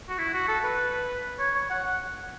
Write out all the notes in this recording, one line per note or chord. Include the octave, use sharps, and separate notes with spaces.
F#4
E4
F#4
A4
B4
C#5
C#5
F#5
F#5